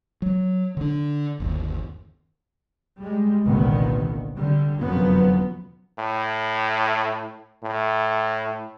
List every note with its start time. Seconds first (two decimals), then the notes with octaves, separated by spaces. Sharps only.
0.22 F#3
0.77 D3 D4
1.40 G1 D#2
2.99 G3 G#3
3.43 G1 C2 A#2 D3 D#3 B3
4.35 D3 G3
4.80 F1 F#2 D3 F3 F#3 B3
5.98 A2
7.63 A2